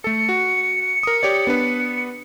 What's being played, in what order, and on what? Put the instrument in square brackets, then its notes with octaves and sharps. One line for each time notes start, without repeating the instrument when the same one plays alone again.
[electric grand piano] A3 A4 [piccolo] C#7
[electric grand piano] F#4
A#4 D#6
G4 C#5 D5
B3 D4 B4